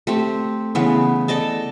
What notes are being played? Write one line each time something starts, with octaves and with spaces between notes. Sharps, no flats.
A3 C4 G4
C#3 E3 B3
A4 D5 D#5 A5